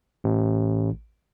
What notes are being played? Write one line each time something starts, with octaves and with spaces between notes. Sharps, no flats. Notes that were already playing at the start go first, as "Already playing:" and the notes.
A1